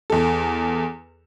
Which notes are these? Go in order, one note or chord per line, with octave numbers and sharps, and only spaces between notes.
E2 A4